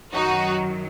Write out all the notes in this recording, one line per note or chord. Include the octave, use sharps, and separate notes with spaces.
F#2 D#3 F#3 D#4 F#4